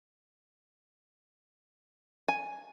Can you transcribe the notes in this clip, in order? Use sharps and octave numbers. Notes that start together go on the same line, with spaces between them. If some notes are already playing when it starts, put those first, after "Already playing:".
G#5